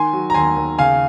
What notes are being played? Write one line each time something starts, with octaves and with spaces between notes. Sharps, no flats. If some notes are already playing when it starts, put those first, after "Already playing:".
Already playing: D#3 G#5 C6
F#3
A#5
D#2 G#5 C6
D#2
C#3 F5 G#5